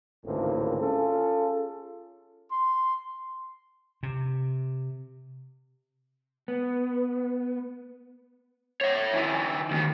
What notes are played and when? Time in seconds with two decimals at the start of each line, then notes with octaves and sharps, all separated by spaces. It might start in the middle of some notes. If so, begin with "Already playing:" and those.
0.25 G#1 C#2 A2 D3 A#3 C4
0.80 C#4 F4 G#4 A4
2.51 C6
4.03 C3
6.48 B3
8.81 C#5 E5
9.14 D#3 E4
9.71 D2 D#3